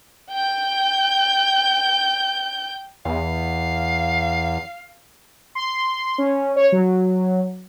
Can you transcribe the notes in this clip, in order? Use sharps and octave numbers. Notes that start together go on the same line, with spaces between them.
G5 G6
E2 F5
C6
C#4
C#5
F#3